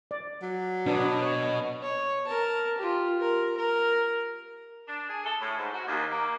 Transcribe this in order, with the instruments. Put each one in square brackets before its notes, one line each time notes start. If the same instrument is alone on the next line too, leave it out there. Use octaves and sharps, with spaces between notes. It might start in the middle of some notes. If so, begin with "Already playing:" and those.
[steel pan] D5
[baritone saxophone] F#3
[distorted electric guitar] B2 [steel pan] D4 C#5
[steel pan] C#5
[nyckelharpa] C#5
A#4 A5
F4 G4
A#4
A#4
[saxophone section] D4
G#4
A4
A2
G#2
F#4
D#2
A#3